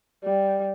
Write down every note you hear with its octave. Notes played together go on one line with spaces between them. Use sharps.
G3